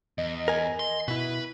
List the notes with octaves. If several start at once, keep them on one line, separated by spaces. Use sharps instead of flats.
E2 D#5
A#4 G#5
C6
B2 E4 B4